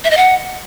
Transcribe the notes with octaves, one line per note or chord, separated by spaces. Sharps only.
E5
D#5
F#5